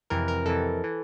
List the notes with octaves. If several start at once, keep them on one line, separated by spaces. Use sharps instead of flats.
F2 C3 E3 A#4
A#4
F2 C3 E3 A4
E3